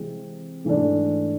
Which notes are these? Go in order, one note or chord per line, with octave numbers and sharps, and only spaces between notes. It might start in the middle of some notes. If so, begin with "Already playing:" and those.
Already playing: C3 E3 G#3 C4
G#2 E3 A3 D4